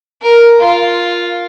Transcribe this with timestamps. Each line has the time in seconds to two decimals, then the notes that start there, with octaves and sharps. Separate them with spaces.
0.22 A#4
0.61 F4